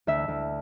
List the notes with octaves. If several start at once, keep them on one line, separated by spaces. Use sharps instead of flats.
D2 E5
D2